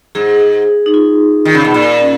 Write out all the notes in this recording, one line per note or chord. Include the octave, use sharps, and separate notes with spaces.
G#2 G#4
D#4
F4
D#3
C#3
B2
A#2
C#4